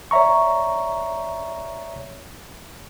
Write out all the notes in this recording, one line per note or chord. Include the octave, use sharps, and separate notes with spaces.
C#5 D5 E5 A#5 C#6